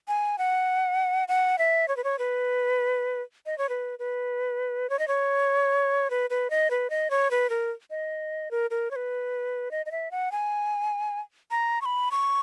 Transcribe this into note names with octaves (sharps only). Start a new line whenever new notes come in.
G#5
F#5
F#5
E5
C#5
B4
C#5
B4
D#5
C#5
B4
B4
C#5
D#5
C#5
B4
B4
D#5
B4
D#5
C#5
B4
A#4
D#5
A#4
A#4
C#5
B4
D#5
D#5
E5
F#5
G#5
A#5
C#6
B5
C#6